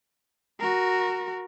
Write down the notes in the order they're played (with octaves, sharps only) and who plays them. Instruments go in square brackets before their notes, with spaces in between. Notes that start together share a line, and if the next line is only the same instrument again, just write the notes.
[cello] F#4 A#4